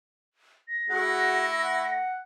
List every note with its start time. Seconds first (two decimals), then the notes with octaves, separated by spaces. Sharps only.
0.68 A#6
0.90 A3 E4 F#4 G#4 F#5
1.63 F#5